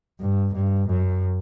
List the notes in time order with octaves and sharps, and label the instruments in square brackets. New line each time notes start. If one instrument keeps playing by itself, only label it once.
[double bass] G2
G2
F#2